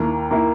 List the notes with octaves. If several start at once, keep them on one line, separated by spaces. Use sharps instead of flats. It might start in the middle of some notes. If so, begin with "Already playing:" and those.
Already playing: D#2 D#3 A#3 E4
D#3 A#3 E4